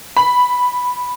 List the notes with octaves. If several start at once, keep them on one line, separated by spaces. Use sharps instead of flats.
B5